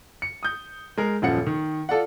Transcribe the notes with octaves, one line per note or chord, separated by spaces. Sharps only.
C#7
D#6 G6
G#3 A#4
D#1 F#2 F3 F#5 C#7
D#3
F4 A4 D5 F#5